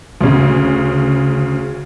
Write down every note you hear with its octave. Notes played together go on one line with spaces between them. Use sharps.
D2 C#3